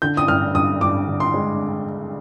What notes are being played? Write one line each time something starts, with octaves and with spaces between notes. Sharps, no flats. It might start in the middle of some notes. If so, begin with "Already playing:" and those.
D3 G6
D#6
G2 F6
G2 D#6
G2 D6
D3
C6
G#3